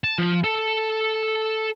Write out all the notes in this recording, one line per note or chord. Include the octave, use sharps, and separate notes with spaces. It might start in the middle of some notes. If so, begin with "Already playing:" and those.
A5
F3
A4